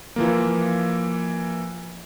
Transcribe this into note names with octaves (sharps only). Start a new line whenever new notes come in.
E3 F3 A#3